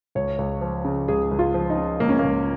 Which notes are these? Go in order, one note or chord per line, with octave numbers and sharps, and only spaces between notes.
C#2 C#5
C#2
F3
C#3
C#2 G#4
C#2
F4
F3
D#4
C#3
C#2 A#3
C#4
A#3
C#2